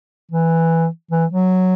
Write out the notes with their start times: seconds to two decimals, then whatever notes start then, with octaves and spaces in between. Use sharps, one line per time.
0.31 E3
1.11 E3
1.30 F#3